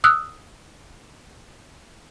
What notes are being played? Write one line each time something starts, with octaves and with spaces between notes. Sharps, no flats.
D#6 E6 F#6